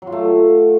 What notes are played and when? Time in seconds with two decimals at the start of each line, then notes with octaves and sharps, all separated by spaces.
0.02 F#3
0.07 F4
0.12 A3